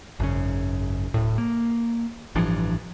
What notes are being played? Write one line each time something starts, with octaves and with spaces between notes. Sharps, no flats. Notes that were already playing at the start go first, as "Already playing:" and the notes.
G#1 F#2 C#3
D1 A2
A#3
A1 G2 E3 F3